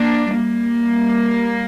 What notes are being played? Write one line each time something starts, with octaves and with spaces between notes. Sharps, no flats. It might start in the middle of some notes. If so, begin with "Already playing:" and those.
Already playing: A#3 D4
G3 A#3